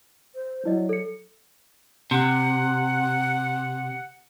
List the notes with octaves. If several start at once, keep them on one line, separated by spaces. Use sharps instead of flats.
C5
F#3 E4 D5 D#5
A4 C#7
C3 F#5